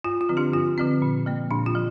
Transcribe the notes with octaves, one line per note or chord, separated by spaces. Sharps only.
G2 F4
F4
D3 F3 C4
D4 G4
G2 F4
D3 F3 C4
A#2
F3 A#3
A#2 D4
F4
F3